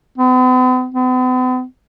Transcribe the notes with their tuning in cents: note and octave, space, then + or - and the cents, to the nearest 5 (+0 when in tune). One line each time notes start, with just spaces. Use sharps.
B3 +45
B3 +45